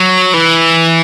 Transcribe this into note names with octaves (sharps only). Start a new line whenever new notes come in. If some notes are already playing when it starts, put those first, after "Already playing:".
Already playing: F#3
E3